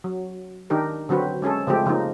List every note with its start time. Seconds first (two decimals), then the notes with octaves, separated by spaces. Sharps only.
0.04 F#3
0.70 D#3 D4 D#4 G4 A#4
1.09 D3 F#3 C4 F#4 B4
1.42 G#3 C#4 G#4 A4
1.67 C#3 F3 G#3 A3 C4 G4
1.86 C#3 F3 A#3 D#4